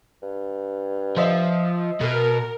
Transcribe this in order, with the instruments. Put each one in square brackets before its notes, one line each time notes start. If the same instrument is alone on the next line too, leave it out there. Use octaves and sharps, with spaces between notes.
[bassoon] G2
[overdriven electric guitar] F3 [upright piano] C5 D#5 E5
[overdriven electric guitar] B2 [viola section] A#4